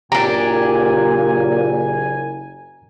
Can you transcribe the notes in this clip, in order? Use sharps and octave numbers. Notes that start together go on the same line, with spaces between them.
F#1 A#2 D4 G4 G#5 A#5